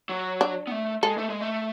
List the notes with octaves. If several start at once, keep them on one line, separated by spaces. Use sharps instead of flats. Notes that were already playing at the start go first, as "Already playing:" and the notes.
F#3
D4
B3
A3
G#3 A4
A3
G#3
A3